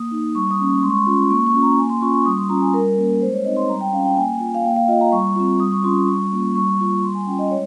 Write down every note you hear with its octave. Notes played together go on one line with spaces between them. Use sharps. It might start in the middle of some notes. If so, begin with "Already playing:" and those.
Already playing: A#3 D#6
D#4
G3 C#6
D#6
A#3 C#4
C#6
G#3 C6
C#6
C6
C#4 F4
A#3 C#6
C#6
C#4 F4
A#5
A#3 G#5
C6
C#4 F4 C#6
C#6
G3 D#6
C6
C#4 F4 A#5
G#5
G3 A#4
A#3 C#4
G#3 C5
C#5
C4 D#4 D#5
C6
G3 A#5
G5
C#4 F4 F5
G5
A#3 G#5
F4
F5
A#3 G5
F5
F4 D#5
A#5
G3 C#6
C4 F4
G3 D#6
C#6
C#4 F4 C6
G3 C#6
A#3 C#4 F4
G3 C#6
A#3 F4
G3 C6
G#5
C#4 F4 G5
D#5
G#3 C#5